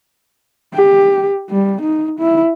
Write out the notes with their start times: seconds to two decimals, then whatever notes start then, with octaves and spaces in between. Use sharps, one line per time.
0.74 G4
1.50 G3
1.82 D#4
2.20 E4